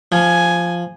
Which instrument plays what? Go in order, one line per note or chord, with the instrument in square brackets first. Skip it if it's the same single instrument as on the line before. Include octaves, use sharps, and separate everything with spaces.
[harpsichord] F3 [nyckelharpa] G#5